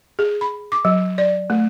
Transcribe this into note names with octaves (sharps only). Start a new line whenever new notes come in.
G#4
B5
D6
F#3
D5
A3